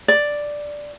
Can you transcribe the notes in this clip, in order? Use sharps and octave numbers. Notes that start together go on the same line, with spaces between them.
D5